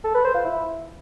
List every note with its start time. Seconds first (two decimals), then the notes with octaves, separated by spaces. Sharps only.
0.04 A4
0.14 B4
0.25 C5
0.35 F4
0.45 E4